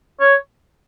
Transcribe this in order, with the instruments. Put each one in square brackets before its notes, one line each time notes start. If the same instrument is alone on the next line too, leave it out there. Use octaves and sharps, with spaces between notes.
[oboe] C#5